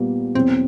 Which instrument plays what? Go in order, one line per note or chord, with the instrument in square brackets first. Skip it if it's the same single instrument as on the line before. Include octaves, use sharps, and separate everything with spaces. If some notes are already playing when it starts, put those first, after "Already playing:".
Already playing: [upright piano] A#2 G3 A#3 [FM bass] B3
[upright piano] E2 B2 F#3 [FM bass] C4